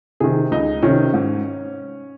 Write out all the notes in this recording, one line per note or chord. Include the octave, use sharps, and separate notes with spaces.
C3 D#3 G#4
C#2 D#4
C3 D#3 C#4
G#2